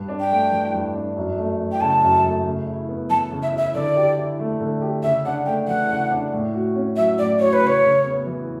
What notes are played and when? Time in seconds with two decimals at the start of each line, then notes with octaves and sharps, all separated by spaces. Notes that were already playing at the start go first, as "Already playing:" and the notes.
Already playing: G2
0.08 D4
0.20 G5
0.30 A3
0.51 E3
0.73 G2
0.94 D4
1.17 F#2
1.38 A3
1.59 E3
1.72 G5
1.81 C#3 A5
2.02 F#2
2.24 A3
2.46 C#3
2.66 E4
2.89 B3
3.10 E3 A5
3.31 C#3
3.43 E5
3.53 E4 E5
3.74 D3 D5
3.96 G4
4.18 E4
4.39 A3
4.61 D3
4.81 G4
5.03 C#3 E5
5.25 D4 F#5
5.46 A3 G5
5.68 E3 F#5
5.90 C#3
6.10 D4
6.33 A2
6.54 F#4
6.75 C#4
6.96 F#3 E5
7.18 A2 D5
7.39 F#4 C#5
7.53 B4
7.61 C#3
7.67 C#5
7.83 C#3
8.04 B3
8.26 E3